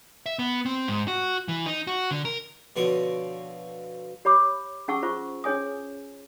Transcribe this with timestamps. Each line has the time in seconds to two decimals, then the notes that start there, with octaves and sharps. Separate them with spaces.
0.26 E5
0.39 B3
0.66 C4
0.88 G#2
1.08 F#4
1.48 E3
1.66 D#4
1.87 F#4
2.11 D3
2.25 A#4
2.76 B2 D3 F3 C#5 D6 D#6
4.25 G4 C#5 B5 D6
4.88 C#4 G#4 F#5 A5 C#6 E6
5.02 F4 C5 C#6
5.44 C#4 G#4 C#5 G#5 D#6